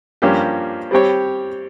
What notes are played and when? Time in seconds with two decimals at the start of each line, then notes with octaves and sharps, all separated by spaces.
0.22 G2 F3 A#3 C#4 G4
0.91 G3 C4 G4 C#5